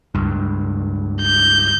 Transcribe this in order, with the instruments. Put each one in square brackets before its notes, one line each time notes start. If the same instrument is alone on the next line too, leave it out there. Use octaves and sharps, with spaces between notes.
[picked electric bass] C#2 G2
[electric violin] G6